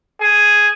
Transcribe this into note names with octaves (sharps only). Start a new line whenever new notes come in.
G#4